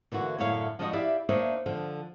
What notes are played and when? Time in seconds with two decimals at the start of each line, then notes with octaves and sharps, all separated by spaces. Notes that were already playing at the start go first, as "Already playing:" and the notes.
0.12 D3 E3 A#3 F#4
0.38 F#2 A2 D3 E4 C#5 F5
0.79 F3 G#3 D4 D#4 F#4 D#5
0.93 E4 G4 D5 E5 F5
1.29 A#3 D4 D#4 C5 C#5 E5
1.66 D3 F3